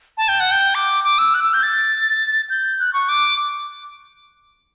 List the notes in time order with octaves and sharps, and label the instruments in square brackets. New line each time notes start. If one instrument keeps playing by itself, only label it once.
[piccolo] A5
G5
F#5
G5
D6
D6
E6
F#6
E6
G6
A6
G6
F#6
C#6
D6